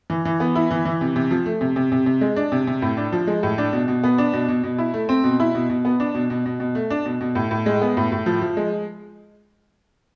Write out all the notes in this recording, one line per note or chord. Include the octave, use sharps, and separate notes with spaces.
E3
E3
B3
E4
E3
E3
C3
C3
F3
A3
C3
C3
C3
C3
G#3
D4
C3
C3
A2
D4
F3
G#3
A2
D4
B2
B2
B3
D4
B2
B2
B2
E4
A3
C4
B2
E4
B2
B2
B3
D4
B2
B2
B2
B2
A3
D4
B2
B2
A2
A2
G#3
B3
A2
A2
F3
F3
G#3